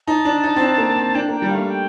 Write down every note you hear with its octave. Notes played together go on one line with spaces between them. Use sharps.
D#4 A5
D4
D#4
C4
D4
A#3
C4
D4 G5
A#3 G5
G3
A3 F5
G5